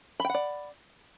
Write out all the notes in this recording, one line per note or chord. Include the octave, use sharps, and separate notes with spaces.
D5 F#5 G5 B5